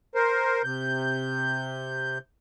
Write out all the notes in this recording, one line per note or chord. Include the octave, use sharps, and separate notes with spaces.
A#4 C5
C3 G6